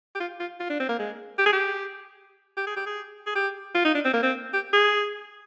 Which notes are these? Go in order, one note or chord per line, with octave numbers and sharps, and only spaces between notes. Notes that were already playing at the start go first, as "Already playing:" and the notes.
G4
F4
F4
F4
D4
C4
A#3
G#3
G4
G#4
G4
G4
G#4
G4
G#4
G#4
G4
F4
D#4
D4
C4
A#3
C4
G4
G#4